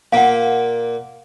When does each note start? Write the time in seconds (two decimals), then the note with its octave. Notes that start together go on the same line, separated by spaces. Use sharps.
0.13 A#2 A#3 F5 F#5